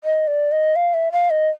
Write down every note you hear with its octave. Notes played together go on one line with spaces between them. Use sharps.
D#5
D5
D#5
F5
E5
F5
D#5